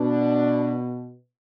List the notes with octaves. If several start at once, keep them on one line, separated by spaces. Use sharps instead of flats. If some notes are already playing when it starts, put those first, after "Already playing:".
Already playing: B2 D4